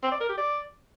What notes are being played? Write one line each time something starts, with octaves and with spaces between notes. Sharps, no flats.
C4
D5
A#4
G4
D5